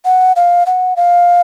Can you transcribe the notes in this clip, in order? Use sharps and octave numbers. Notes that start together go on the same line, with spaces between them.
F#5
F5
F#5
F5